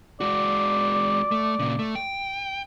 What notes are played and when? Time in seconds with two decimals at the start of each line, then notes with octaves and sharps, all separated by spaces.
0.21 G#3 F#4 D5
1.31 A3
1.59 A#2 C#3
1.79 A3
1.95 G5